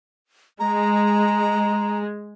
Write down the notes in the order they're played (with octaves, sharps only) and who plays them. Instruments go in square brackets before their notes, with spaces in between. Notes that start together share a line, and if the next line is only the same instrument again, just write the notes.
[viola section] G#3 [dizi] A#5